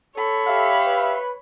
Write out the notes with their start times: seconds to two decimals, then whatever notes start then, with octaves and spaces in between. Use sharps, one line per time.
0.17 A4 C#5 B5
0.47 G4 E5 F5
0.86 B4